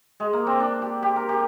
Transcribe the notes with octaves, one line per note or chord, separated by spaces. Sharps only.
G#3
A#3
C4
D4
G4
G4
A#4
G4